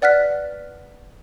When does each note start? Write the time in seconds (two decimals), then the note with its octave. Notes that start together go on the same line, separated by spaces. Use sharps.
0.02 B4 D5 F#5 F6 F#6 B6